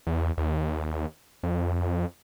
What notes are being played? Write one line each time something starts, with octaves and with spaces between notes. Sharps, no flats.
E2
D#2
F2